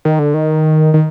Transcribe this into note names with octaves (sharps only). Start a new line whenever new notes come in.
D#3
D3
D#3
D#3